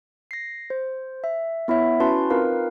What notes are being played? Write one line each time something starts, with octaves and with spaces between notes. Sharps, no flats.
A#6 C7
C5
E5
B3 E4 C#5 E5
C#4 E4 F#4 B4 A5 C6
C4 D#4 F4 A#4 B4 F5